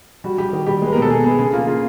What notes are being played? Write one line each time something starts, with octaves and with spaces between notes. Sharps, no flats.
G3 F#4
G3 G4
D#3
G3 G4
G#3 B4
B2 A#4
A4
B2 G#4
B3 G#4
C#3 G#4
A#3 F4
C#3 F4